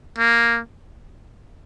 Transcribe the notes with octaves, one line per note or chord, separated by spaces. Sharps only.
A#3